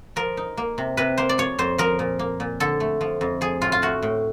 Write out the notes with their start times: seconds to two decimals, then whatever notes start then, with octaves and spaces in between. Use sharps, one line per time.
0.16 F3 A#4
0.37 D#4
0.57 A#3
0.78 C3
0.97 C3 B4
1.18 A#3 C5
1.29 D5
1.38 F3 C#5
1.59 F2 C5
1.78 F3 A#4
1.99 A#2
2.19 A#3
2.40 A#2
2.60 D3 A4
2.80 A3
3.01 F3
3.21 F2
3.41 F3 G#4
3.62 A2 F4
3.72 F4
3.82 A3 F#4
4.02 A2